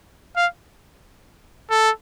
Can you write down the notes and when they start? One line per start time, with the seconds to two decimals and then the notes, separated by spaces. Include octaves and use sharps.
0.36 F5
1.70 A4